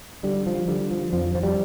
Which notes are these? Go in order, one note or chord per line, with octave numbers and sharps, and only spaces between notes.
D3 G3
F3
D3 G3
F3
F2 F3
F3
G3